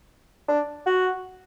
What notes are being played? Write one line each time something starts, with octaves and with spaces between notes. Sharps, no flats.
D4
F#4